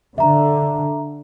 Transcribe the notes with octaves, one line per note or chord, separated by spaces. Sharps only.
D3 E5 A#5